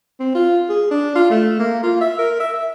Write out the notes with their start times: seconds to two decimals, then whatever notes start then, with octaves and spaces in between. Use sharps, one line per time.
0.20 C4
0.35 F4
0.69 G#4
0.91 D4
1.15 F4
1.30 A3
1.59 A#3
1.83 F4
2.01 E5
2.18 A#4
2.40 E5
2.60 E5